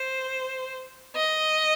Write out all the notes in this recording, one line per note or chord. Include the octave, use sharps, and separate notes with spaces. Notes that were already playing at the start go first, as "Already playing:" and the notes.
Already playing: C5
D#5